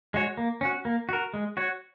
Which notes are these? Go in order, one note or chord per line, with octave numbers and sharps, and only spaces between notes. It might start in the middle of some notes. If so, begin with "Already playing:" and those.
G#3 F#4 C#5
A#3
C#4 F#4
A#3
F#4 A#4
G#3
F#4 C#5